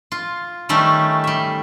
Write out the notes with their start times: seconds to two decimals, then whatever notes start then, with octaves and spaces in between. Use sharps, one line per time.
0.12 F4
0.69 D#3 G3 A3 C#4
1.24 G3 E5